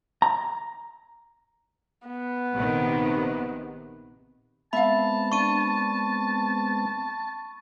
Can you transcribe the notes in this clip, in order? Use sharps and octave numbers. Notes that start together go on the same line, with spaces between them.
A#5
B3
A#1 C3 D#3
G#3 B3 C4 E5 F5 A5 B5
D4 C#6 D#7